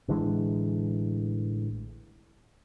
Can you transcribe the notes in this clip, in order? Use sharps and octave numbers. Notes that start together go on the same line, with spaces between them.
A1 D3 E3 G#3